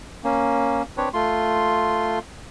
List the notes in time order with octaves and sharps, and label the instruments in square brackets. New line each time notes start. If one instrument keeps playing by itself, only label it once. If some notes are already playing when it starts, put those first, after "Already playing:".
[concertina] A#3 C#4
C4 D4 B4 C#5
A3 F4 C6